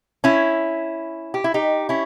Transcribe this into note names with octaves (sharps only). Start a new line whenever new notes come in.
C#4 E4
G4
E4
D#4 G4
C#4 E4